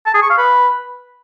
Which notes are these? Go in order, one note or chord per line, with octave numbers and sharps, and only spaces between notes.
A5
G#4
C#6
F5
B4